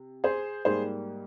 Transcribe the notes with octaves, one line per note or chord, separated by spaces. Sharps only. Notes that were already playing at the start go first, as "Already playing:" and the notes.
Already playing: C3
G#4 C5
G#2 G3 A#3 G#4 C5